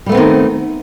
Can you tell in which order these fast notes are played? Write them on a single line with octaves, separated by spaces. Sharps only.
G3 A3 B3 C4 D#3